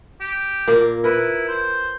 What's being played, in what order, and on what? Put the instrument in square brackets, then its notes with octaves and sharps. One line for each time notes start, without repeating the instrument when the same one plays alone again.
[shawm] G4
[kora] A#2 A#3
[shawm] E4 [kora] A#4 B4
[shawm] C5